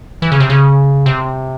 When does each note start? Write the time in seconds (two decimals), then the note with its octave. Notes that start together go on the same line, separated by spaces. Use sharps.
0.22 E3
0.32 C#3
0.40 C3
0.50 C#3
1.06 C3